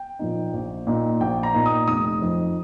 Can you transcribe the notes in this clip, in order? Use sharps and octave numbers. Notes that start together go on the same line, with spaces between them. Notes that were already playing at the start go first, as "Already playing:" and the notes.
Already playing: G5
A#2 F3 A#3 D#4
A#1
A#2 A#3 D#4
A#1 G5
A#5
A#2 A#3 D#4
D#6
F1 D#6
F2 F3 D#4